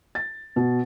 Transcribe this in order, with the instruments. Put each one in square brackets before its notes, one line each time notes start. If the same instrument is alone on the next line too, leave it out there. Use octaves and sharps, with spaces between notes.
[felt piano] A6
B2